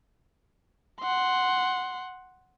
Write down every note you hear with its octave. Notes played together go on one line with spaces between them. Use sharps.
F#5 C6